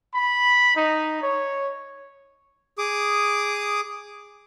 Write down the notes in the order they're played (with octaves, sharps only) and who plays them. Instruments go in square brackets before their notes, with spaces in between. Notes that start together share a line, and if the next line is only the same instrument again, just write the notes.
[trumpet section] B5
D#4
C#5
[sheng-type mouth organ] G#4 D6 D#6